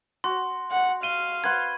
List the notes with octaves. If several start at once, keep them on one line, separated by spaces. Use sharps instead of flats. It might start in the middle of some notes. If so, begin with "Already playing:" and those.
F#4 C6
F#5
F5 D#7 G7
B4 F#5 C6 G#6